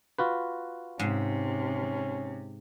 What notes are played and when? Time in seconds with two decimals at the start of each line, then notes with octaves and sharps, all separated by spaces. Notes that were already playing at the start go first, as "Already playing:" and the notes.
0.19 F4 F#4 B4
0.99 G#2 C3 C#4